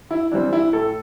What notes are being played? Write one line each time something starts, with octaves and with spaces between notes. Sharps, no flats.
E4
E3 G3 C4 D4
E4
A2 A4